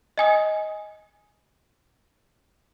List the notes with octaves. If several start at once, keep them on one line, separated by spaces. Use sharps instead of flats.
D#5 G#5 D#6